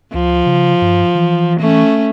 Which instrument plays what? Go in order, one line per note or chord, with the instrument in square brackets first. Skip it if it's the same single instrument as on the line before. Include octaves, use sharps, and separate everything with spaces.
[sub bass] C#2 [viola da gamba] F3
[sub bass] C#3
G2
E3
[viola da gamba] A3 C#4